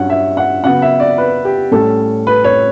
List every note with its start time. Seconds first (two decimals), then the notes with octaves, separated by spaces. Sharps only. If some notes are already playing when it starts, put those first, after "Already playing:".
Already playing: G2 F#3 C#4 F#5
0.10 E5
0.37 F#5
0.64 C#3 F#3 B3 F#5
0.82 E5
1.00 D5
1.18 B4
1.45 G4
1.72 A2 G3 C#4 A4
2.27 B4
2.44 C#5